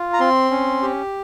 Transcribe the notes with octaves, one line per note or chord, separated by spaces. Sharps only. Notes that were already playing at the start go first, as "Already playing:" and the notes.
Already playing: F4
A#5
C4 C6
C#4
G4